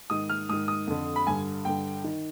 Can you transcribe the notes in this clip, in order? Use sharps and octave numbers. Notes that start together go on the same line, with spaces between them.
G#2 D#3 D#6
F6
G#2 D#3 D#6
D#6
F2 D3
B5
G2 D3 G#5
G2 D3 G5
D#3